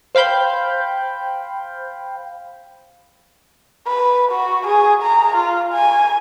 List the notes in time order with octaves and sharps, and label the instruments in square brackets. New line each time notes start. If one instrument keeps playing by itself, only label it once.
[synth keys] C5 F5 G5 B5 G6
[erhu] B4
F#4
G#4
A#5
F4
G#5